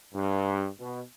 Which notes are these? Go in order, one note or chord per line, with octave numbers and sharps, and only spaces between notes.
G2
B2